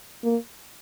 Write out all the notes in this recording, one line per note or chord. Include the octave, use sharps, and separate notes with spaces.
A#3